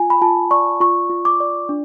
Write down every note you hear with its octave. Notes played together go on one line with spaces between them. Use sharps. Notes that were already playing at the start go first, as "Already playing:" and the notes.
Already playing: F4 G#5
B5
F4 A5
D5 C#6
F4 C#6
F4
D6
D5
D4